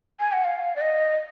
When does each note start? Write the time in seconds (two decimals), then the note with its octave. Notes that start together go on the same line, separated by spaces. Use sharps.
0.20 G#5
0.33 F#5
0.45 F5
0.76 D5
0.81 D#5